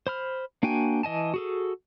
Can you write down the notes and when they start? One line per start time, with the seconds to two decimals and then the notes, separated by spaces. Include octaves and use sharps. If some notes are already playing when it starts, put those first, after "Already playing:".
0.07 C5 B5 F6
0.63 A#3 D4 F#4 G5 G#5
1.03 E3 D#5 G#5 A5
1.34 F#4 G#4 A4